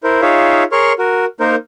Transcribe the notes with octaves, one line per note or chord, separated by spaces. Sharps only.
E4 A#4 C5
D#4 F4 G#4 C#5 E5 F5
G#4 A#4 C#5 C6 C#6 F6
F#4 A#4
A#3 D#4 A#4 C5